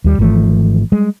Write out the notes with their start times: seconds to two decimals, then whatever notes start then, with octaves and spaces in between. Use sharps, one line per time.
0.04 D#2 G3
0.19 G#1 E3 F3 A3
0.92 G3 G#3